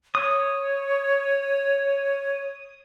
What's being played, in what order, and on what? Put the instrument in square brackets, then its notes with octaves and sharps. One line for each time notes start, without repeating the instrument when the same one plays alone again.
[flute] C#5 [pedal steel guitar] D#6